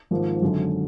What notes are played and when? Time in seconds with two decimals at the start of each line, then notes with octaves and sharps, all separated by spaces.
0.11 G#1 G#2 F3 A#3
0.42 G#1 F#2 D3